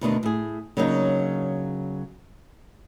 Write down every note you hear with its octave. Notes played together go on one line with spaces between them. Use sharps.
D2 B2 D#3 D4
A2 G#4
C#3 F#3 A#3 D4 D#4